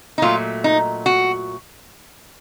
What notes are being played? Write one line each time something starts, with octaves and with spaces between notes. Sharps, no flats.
D#4
A#2 F#3 A3 F4
D#4
F#4